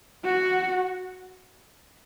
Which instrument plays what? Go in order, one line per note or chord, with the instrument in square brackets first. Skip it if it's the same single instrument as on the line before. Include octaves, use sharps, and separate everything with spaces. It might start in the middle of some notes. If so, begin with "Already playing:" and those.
[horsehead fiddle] F#4